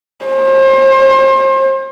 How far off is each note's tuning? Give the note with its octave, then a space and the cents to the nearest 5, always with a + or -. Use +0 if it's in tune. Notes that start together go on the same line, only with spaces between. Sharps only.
C5 +35